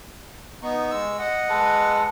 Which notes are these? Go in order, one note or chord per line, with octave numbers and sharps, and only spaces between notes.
B3 D#4 C#6
G#3 E6
D#5 F#5
G#3 A4 B4